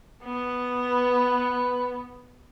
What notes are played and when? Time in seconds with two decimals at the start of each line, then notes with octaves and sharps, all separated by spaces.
0.23 B3
0.91 B4